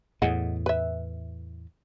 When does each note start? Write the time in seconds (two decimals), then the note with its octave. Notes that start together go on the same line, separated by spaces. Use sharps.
0.22 E2 A2 G#4 D#5 F#5
0.66 B4 E5